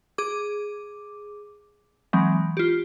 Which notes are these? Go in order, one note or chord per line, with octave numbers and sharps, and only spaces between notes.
G#4 D6
E3 F#3 G#3 C4
F4 G4